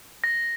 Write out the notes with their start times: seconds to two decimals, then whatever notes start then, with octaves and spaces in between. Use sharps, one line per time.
0.24 A#6